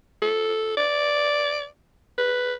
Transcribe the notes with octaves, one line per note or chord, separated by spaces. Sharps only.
A4
D5
B4